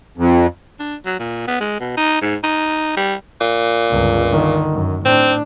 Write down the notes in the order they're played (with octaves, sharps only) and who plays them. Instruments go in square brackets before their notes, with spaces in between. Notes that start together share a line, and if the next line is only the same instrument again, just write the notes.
[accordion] F2
[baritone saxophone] D4
F#3
A#2
B3
G#3
B2
D#4
G#2
D#4
G3
[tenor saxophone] A#2
[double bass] G1 C#2
D3 D#3
F#2
[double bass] A2 D4 [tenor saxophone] C4